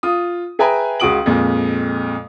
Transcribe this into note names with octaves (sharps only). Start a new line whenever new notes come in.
F4 D#6
G#4 B4 E5 G5 G#5 A#5
C#2 C#3 F#4 D#6 D7 F#7
F2 A#2 G#3